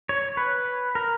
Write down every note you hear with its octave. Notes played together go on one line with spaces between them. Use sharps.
C#5
B4
A#4